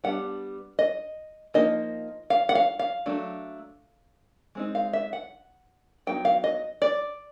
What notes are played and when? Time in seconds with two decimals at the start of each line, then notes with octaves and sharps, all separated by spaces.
0.04 G3 B3 D4 F#5
0.79 D#5
1.54 F3 A#3 D#4 D#5
2.30 F5
2.49 F#5
2.55 F5
2.79 F5
3.06 F#3 A3 D4
4.55 G#3 C4 D#4
4.75 F5
4.93 E5
5.13 F#5
6.07 F#3 B3 D#4 G5
6.25 F5
6.44 D#5
6.82 D5